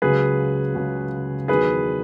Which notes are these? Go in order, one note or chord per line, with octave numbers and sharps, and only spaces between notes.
C#2 C#3 F#3 G#4 B4
C#2 C#3 F#3
E2 D#3 F#3 G#4 B4